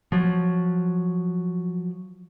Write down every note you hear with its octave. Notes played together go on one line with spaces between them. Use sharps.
F3 F#3